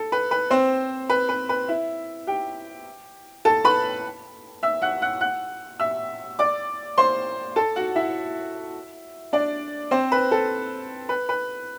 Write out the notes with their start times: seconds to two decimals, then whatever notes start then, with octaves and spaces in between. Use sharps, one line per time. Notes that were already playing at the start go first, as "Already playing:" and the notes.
Already playing: A4
0.12 B4
0.31 B4
0.50 C4 C5
1.09 B4
1.29 B4
1.49 B4
1.68 E4 E5
2.27 G4 G5
3.45 A4 A5
3.65 B4 B5
4.63 E5 E6
4.82 F#5 F#6
5.02 F#5 F#6
5.21 F#5 F#6
5.80 E5 E6
6.39 D5 D6
6.98 C5 C6
7.56 A4 A5
7.76 F#4 F#5
7.96 E4 E5
9.33 D4 D5
9.91 C4 C5
10.12 B4
10.31 A4
11.09 B4
11.29 B4